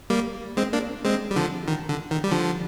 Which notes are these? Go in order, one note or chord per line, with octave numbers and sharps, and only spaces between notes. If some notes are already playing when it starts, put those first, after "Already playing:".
G3 A#3
G#3 C4
A#3 D4
G#3 C4
G3
D3 F3
D#3
D3
D#3
G3
D3 F3